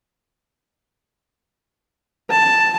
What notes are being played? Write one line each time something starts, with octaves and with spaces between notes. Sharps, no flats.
A5